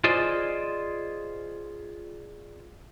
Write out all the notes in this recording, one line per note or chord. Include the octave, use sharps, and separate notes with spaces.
F4 G#4 C5 D5 D#5